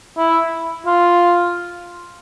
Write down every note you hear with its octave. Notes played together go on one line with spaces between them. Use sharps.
E4
F4